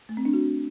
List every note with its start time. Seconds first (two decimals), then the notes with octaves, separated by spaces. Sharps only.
0.09 A3
0.17 C4
0.25 D4
0.34 F#4